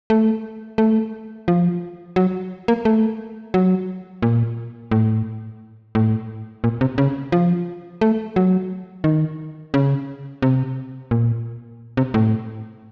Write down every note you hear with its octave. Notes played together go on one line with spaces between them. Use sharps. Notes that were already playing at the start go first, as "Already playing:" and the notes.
A3
A3
F3
F#3
A#3
A3
F#3
A#2
A2
A2
A#2
C3
C#3
F3
A3
F#3
D#3
C#3
C3
A#2
C3
A2